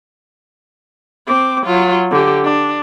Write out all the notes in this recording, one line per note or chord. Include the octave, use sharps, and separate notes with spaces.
C4 D6
F#3 F4
D3 G4
D4